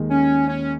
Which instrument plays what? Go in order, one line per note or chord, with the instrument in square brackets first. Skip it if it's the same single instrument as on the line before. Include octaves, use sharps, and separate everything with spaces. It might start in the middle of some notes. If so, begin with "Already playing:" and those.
Already playing: [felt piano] D#2 D#3 G#3
[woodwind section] C#4
C#4